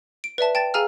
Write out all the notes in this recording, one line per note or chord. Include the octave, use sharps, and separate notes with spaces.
D7
B4 D5 E5 A5
G5 A5 A6
G#4 F5 G#5 A#5 E6 F6